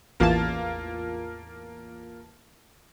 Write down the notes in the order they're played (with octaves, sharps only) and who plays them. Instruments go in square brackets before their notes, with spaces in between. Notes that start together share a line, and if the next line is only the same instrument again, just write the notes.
[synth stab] A1 E2 A5 [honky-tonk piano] A#3 F4